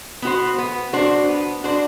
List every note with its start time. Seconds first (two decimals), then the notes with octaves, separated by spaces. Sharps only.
0.22 B3 F#4 C5
0.58 B3
0.93 D4 F#4 C5
1.28 B3
1.64 D4 F#4 C5